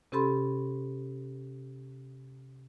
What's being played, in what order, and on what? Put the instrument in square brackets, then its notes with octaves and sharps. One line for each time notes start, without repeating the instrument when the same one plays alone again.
[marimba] C3 C#4 G4 A4 B5 C6